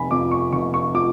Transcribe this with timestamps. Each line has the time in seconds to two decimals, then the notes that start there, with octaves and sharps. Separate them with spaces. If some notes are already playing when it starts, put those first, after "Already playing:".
Already playing: F1 G#5 B5
0.11 F2 F3 D6
0.31 C#6
0.52 F1 C#6
0.74 C#6
0.94 F3 D6